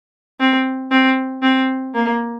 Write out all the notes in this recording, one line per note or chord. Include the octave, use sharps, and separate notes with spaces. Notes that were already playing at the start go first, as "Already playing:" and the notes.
C4
C4
C4
A#3